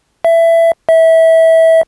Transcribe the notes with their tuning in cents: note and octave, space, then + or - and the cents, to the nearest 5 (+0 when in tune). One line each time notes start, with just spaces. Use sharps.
E5 +15
E5 -20